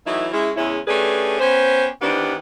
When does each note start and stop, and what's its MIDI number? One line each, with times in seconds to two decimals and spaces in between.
0.06 0.27 52
0.06 0.27 54
0.06 0.27 57
0.06 0.27 59
0.06 0.27 63
0.06 0.27 64
0.32 0.51 56
0.32 0.51 61
0.32 0.51 64
0.56 0.78 40
0.56 0.78 49
0.56 0.78 56
0.56 0.78 61
0.56 0.78 64
0.87 1.38 57
0.87 1.38 61
0.87 1.38 62
0.87 1.38 67
0.87 1.38 68
0.87 1.38 71
1.40 1.87 59
1.40 1.87 61
1.40 1.87 67
1.40 1.87 72
2.01 2.35 51
2.01 2.35 52
2.01 2.35 59
2.01 2.35 60
2.01 2.35 62
2.01 2.35 67